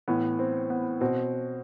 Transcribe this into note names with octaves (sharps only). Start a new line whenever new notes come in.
A2 E3 B3
C4
B3
B2 C4